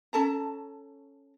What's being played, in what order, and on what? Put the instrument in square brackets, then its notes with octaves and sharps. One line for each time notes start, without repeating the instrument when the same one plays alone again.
[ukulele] C#4 A4 A5 A#5